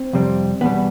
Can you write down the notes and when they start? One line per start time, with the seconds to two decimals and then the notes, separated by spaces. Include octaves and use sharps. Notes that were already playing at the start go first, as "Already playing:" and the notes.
Already playing: C4
0.13 F2 C3 G3
0.61 E2 B2 G3 B3